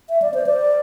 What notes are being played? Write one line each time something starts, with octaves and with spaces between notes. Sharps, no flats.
E5
D5
C5
D5